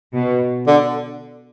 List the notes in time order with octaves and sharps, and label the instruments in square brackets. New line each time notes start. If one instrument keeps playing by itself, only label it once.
[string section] B2
[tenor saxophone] D3